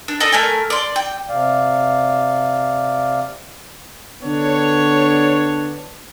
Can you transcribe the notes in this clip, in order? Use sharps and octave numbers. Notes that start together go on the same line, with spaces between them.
D4
A4 D5 D#5
A3 A#4 G#5
D5 C6
G5
C3 D5 F5
D3 B3 D4 C#5